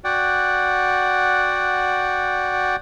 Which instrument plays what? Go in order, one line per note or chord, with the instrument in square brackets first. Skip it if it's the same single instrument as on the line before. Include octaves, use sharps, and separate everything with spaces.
[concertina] F#4 D5 F#5 G5